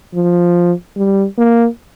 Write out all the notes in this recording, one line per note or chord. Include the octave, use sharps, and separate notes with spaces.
F3
G3
A#3